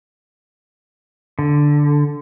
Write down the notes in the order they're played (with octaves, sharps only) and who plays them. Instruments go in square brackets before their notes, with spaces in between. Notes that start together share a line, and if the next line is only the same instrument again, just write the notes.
[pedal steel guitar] D3